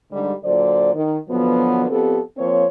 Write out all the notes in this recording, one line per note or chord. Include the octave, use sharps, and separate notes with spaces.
G#2 D3 G3
A#2 D3 F#3 C5 D5
D#3
B2 D3 F3 F#3 B3
F2 B3 C4 G4 A4
F3 A#3 C4 C5 C#5